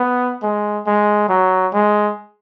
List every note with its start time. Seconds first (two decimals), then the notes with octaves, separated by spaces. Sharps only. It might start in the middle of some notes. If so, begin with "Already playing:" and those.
Already playing: B3
0.43 G#3
0.87 G#3
1.29 F#3
1.73 G#3